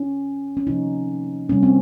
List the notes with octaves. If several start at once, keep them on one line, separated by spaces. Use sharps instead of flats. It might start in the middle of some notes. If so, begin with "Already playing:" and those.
Already playing: C#4
C#4
C3 F3 A#3 D#4
C3 G3 A#3 C#4
C4